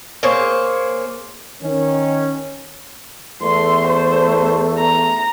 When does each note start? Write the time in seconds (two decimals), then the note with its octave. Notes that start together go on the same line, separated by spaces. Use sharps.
0.23 A#3 G#4 C5 C#5
1.62 D#3 C#4
3.42 E2 A3 C6
3.87 C5
4.78 A#5